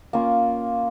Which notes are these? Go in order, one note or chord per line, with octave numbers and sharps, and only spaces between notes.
A#3 C#4 F4